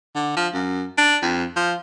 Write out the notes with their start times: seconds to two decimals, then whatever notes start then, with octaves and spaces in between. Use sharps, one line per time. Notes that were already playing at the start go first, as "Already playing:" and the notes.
0.15 D3
0.36 F3
0.54 F#2
0.98 D4
1.22 F2
1.56 F3